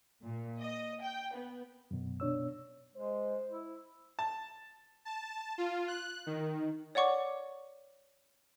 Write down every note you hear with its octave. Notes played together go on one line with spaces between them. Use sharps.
A#2
D#5
G5
B3
F#2 B2
B2 D4 C#5 E6
G#3 C5
E4
A5
A5
F4
F#6
D#3
C#5 D5 F#5 C#6 D6